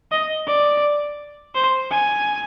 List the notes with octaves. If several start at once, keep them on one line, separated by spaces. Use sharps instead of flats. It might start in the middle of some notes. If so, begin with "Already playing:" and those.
D#5
D5
C5
G#5